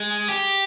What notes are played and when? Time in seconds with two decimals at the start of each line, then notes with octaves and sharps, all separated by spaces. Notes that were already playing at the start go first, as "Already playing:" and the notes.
Already playing: G#3
0.29 G4